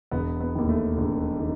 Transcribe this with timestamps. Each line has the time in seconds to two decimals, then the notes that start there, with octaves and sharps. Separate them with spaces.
0.12 E1 B3
0.41 B3
0.55 D#2 D#3
0.69 A3
0.98 E1
1.40 D#3